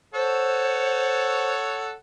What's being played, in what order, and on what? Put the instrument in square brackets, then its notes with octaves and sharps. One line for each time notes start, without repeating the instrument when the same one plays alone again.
[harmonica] A4 C#5 F#5 [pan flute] C5